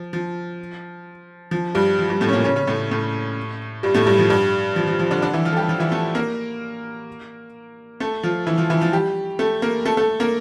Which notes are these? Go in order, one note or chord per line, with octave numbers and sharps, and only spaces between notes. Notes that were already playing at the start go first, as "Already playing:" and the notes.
Already playing: F3
F3
F3
G2 G3
F3
G2 G3
A2 A3
C#4
A#2 A#3
C#3 C#4
C#3 C#4
A2 A3
A2 A3
G2 G3
A2 A3
G2 G3
F3
G2 G3
F3
F3
F3
D3 D4
D3 D4
E3 E4
F3 F4
A4
G3 G4
F3 F4
E3 E4
A3 A4
A#3 A#4
A3 A4
F3 F4
E3 E4
F3 F4
E3 E4
F3 F4
G3 G4
A3 A4
A#3 A#4
A3 A4
A3 A4
A#3 A#4